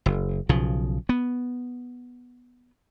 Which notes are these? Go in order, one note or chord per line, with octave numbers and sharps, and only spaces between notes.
F#1
B1 C#3 F3
B3